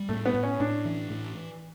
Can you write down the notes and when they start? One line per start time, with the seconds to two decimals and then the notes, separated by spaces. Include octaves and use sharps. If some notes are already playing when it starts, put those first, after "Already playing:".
Already playing: G3
0.09 A2 A3
0.25 B3
0.34 A2
0.43 C#4
0.60 A2 D4
0.85 E3
1.10 A2